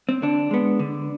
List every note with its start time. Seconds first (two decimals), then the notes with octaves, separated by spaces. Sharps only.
0.09 C4
0.22 D3 D4
0.51 G#3 B3
0.79 D3